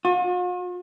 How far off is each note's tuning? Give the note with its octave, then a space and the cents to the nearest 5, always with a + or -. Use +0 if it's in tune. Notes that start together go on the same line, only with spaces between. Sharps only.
F4 +45